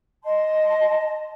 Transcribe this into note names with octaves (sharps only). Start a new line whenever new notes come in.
D#5 A5 C6